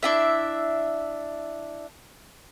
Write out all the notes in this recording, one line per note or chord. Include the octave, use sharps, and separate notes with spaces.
D4 E4 E5